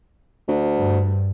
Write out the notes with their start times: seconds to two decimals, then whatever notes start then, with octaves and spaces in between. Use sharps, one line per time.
0.48 D2
0.77 G2